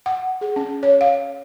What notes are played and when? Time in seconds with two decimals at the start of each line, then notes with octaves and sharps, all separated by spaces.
0.06 F#5
0.41 G#4
0.56 C#4
0.83 C#5
1.01 F5